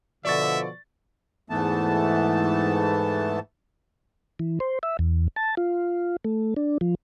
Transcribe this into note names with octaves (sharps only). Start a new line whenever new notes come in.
B2 D3 F3 D5 E5 C#6 A6
E2 G#2 E3 A3 B3 A5
E3
C5
E5
E2
A5
F4
A3
D4
F3